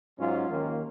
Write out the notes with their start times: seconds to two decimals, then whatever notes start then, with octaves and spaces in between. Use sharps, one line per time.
0.19 G#2 F#3 C#4 F4
0.50 D#2 D#3 A#3 C#4 F4